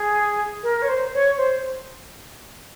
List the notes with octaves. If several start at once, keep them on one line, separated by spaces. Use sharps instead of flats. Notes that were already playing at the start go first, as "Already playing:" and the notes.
Already playing: G#4
A#4
C#5
C5
C#5
C5